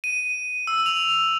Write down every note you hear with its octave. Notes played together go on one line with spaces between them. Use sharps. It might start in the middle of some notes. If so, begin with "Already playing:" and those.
D#7
E6
F7